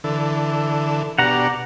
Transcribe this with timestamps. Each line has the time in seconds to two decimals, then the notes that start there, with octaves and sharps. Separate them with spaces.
0.04 D3 E3 A4
1.18 B2 D4 G4 F#5 A#5